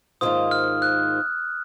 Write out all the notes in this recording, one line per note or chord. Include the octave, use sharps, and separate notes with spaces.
G#2 D#3 A#3 F4 C5 D#6
F6
F#6